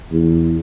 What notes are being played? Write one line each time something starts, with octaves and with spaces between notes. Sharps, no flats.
E2